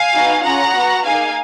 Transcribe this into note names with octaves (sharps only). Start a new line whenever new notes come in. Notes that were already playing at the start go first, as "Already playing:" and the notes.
Already playing: F5 G#5
B3 D#4 F#4
C#4 F4 G#4 F#5 A#5
B3 F#4
A#3 D#4 G#4 F5 G#5